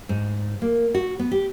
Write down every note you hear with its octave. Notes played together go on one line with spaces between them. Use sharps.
G#2
A#3
F#4
B3
G4